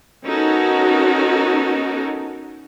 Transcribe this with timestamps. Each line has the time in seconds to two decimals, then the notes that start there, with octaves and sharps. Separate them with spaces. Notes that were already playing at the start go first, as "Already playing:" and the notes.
0.26 B3 C#4 D#4 F#4 A4 A#4